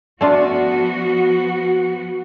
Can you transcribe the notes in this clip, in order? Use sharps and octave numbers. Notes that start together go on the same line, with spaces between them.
F3 A3 B3 D4 F4 F#4